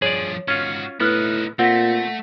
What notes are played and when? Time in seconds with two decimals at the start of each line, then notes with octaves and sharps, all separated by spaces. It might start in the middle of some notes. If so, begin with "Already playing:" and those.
0.02 G2 F3 G#4 C#5 D5
0.48 G#2 C#4 F4 F#4
1.00 A2 B3 D#4 E4 B4 F6 F#6
1.59 A#2 A3 C4 F#5 A#6 B6